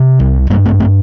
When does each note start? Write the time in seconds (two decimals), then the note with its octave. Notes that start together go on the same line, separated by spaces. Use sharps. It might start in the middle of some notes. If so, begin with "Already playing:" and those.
Already playing: C3
0.20 C2
0.50 G2 G3 A#3
0.65 A3 C4
0.80 A3 C4